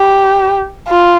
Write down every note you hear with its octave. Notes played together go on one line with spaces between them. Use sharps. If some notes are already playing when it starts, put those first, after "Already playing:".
Already playing: G4
F4